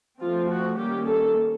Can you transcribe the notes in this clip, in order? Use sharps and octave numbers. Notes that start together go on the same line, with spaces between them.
F3 A3 C4 F4
F#4
D#3 G3 A#3 C#4 G4
A4